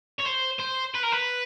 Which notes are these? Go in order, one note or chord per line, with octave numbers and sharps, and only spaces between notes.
C#5
C5
C5
B4
A#4
B4